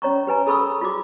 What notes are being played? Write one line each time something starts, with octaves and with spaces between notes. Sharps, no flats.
C#4 C#5 A#5 C#6
G4 B4 G#5 A#5
G#4 A4 B5 C#6 D#6 E6
F4 F#4 D6